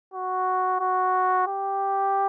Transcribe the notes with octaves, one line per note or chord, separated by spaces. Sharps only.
F#4
F#4
G4